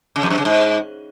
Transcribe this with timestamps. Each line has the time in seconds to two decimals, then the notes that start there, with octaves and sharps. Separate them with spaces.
0.16 C#3
0.23 F2
0.30 F#2
0.38 C#3
0.45 G#2